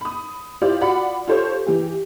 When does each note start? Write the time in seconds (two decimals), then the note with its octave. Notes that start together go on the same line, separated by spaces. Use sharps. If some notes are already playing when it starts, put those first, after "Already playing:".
0.01 B5 D#6
0.61 E4 F4 G4 C5 D5 F5
0.81 F4 F#4 D5 F#5 B5
1.28 F4 G4 A4 C5 C#5
1.67 E3 G4 G#4